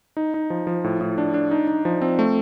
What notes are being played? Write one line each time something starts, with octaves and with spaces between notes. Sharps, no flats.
D#4
D#4
F3
F3
A2
A2
D4
D4
D#4
D#4
F3
C4
A3